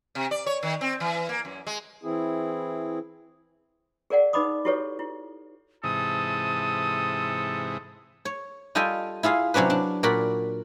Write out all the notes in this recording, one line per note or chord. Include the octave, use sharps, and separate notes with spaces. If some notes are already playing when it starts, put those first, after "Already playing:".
C3
D5
C#5
D#3
C4
E3
A#3
F#2
G#3
E3 C4 E4 G#4
G#4 A#4 D5 F5 F#5
D#4 B4 D#5 B5 D6 D#6
E4 F#4 G4 A4 B4 C#5
E4
G#2 C3 E3 A4 D#6
C#5
G3 F4 A4 D#5 G5 G#5
E4 F4 G#4 F5
C3 F#3 C#4 D4 B4
D4
A#2 F#4 A#4 D5 B5